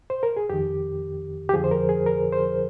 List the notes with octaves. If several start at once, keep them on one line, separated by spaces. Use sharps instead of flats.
C5
A#4
G#4
F2 D#3 G4
G4
F2 D3 F3 G#4
C5
A#4
G#4
A#4
C5